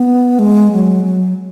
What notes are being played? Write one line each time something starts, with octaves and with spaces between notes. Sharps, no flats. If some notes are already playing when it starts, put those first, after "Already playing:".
Already playing: B3
G#3
F#3
F#3